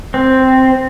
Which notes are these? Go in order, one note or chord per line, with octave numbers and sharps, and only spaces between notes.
C4